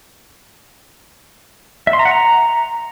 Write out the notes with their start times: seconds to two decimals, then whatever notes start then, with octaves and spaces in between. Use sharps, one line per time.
1.87 E5
1.93 C6
1.99 A#5
2.05 F#5
2.11 A#5